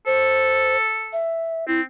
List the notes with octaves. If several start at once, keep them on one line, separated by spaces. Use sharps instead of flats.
A4 C5
E5
C4 E4